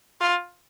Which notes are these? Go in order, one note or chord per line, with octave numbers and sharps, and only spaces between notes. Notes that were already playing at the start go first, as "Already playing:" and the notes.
F4